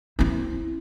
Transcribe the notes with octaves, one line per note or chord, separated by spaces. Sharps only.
C4 E4